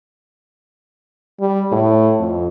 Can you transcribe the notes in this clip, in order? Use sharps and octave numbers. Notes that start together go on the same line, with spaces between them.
G3
A2
F2